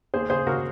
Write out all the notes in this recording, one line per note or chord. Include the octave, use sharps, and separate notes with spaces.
D#2 G#4 C5
C#3 G#4 C5
C#3 F#4 A#4